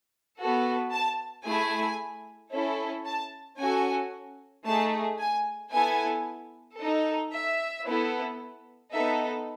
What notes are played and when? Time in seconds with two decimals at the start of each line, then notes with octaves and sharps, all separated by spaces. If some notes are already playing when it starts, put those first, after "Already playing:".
0.39 B3 F#4 A4
0.92 A5
1.45 A3 E4 G#4 G#5
2.53 C#4 E4 A4
3.05 A5
3.59 C#4 F#4 A4 G#5
4.66 A3 D#4 G#4 A5
5.19 G#5
5.72 B3 E4 A4 G#5
6.78 D#4 A4
7.32 E5
7.85 B3 E4 A4
8.92 B3 D#4 A4 E5